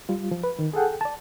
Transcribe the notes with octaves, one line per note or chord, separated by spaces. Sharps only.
G3 F4
F3
B4
D#3
G#4 A4 F#5 G5
D5 A5